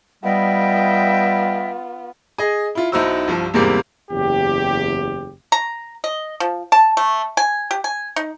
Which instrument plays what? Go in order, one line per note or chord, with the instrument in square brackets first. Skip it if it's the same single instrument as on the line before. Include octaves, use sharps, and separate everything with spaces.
[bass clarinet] G3 [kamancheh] B3 F4 [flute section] D#5 E5 G5
[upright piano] G#4 D#5
E4 F4
B1 D#4 E4 F#4 C5 E6
C2 G2 F3
E2 G#2 C3 G3 A#3
[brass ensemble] F#1 E2 G4
[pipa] A#5
D#5
F3
A5
A3
G#5
G4
G#5
D#4